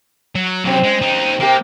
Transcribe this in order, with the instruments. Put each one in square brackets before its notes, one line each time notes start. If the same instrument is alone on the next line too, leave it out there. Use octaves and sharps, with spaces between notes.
[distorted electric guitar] F#3
[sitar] F#2 C4 [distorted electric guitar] C3 F#3
[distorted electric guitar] G#3
D#4 G4
[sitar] C3 G4 [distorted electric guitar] A#3